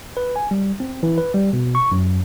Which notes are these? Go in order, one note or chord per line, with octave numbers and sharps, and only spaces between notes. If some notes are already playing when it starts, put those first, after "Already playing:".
B4
G#5
G3
C4
E3
B4
G3
B2
C#6
F#2